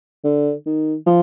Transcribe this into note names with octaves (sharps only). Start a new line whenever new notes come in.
D3
D#3
F3